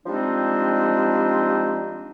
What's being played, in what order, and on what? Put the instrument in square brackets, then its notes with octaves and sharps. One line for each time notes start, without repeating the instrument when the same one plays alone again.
[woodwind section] F3 G3 G#3 C4 D4 D#4